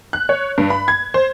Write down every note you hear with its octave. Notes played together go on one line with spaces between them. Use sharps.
F#6
C#5
G2
B5
G#6
C5